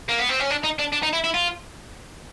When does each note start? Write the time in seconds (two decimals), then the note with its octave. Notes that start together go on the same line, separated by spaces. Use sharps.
0.09 A#3
0.19 B3
0.29 C4
0.40 C#4
0.50 D4
0.64 D#4
0.79 D4
0.93 D4
1.03 D#4
1.13 E4
1.24 E4
1.34 F4